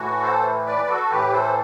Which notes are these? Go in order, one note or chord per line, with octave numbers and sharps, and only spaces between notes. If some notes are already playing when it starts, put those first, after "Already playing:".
Already playing: A2 E3 F#4
A4 C5
B4 D5
F#4 A4
A2 E3 G4 B4
A4 C5